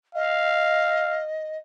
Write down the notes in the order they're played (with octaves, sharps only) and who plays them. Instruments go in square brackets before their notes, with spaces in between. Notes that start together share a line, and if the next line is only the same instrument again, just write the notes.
[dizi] D#5 [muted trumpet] F5